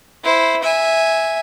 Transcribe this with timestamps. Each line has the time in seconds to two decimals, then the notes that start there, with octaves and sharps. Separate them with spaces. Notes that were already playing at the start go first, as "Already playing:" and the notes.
0.23 E4 C5
0.63 E5 G#5